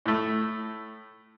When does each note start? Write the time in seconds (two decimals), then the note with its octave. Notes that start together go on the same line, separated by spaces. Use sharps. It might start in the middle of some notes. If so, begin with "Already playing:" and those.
0.06 A2 A3